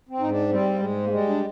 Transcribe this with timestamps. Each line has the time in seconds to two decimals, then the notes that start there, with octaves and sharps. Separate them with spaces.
0.09 C4
0.19 G#2 D#4
0.29 D4
0.49 G3 C4
0.74 A#3
0.79 G#2 G#3
1.04 A#3
1.09 G3 G#3
1.28 D4